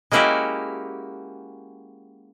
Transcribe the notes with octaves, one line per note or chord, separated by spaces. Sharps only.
G#3 A#3 C#4 E4 F#4 G4